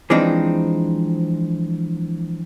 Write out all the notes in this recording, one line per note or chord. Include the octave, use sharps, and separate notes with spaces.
E3 F3 G#3 C4 D4 D#4